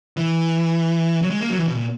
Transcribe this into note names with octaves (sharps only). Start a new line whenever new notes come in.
E3
F#3
G#3
A#3
F#3
E3
B2
A#2